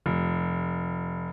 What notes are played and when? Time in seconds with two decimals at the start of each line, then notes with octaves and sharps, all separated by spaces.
0.06 F1